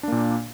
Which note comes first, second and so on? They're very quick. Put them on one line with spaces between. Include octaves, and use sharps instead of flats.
D4 A#3 A#2